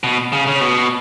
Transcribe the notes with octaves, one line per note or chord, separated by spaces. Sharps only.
B2
C#3
C#3
B2